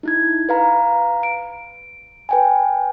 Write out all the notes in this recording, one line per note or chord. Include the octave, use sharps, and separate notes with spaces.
D#4 E4 G#6
B4 F5 A#5
D7
B4 G5 G#5